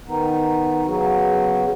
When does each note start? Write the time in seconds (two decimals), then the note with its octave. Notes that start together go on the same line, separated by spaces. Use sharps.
0.06 D#3 B3 D#4
0.86 C#3 F#3 B3 F#4